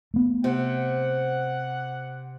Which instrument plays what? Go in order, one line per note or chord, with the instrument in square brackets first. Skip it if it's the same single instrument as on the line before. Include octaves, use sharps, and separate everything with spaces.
[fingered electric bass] A3 B3
[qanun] C3 [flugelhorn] F#5